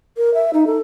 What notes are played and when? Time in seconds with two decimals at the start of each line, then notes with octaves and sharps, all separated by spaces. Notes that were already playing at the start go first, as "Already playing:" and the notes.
0.17 A#4
0.34 E5
0.53 D#4
0.67 A4